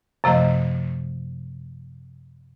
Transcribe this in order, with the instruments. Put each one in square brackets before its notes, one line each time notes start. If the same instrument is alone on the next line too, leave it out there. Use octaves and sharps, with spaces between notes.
[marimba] F#2 C3 F3 A3 D#5